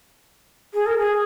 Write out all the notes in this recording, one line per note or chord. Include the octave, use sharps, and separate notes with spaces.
G#4
A#4
G#4